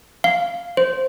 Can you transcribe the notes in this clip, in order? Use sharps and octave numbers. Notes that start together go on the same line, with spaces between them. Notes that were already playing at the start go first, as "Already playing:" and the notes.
F5
C5